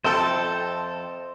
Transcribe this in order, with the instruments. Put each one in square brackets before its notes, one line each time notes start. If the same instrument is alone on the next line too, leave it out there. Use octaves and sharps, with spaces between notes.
[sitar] F2 A4 [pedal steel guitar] C5 E5 G5